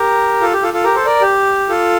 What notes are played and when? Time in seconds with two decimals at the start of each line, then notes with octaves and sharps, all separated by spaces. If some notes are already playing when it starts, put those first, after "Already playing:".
Already playing: G4 A#4
0.41 F4 A4
0.52 G4
0.63 F4 A4
0.73 F4 A4
0.84 G4 A#4
0.95 A4 C5
1.05 A#4 D5
1.21 G4
1.69 F4 A4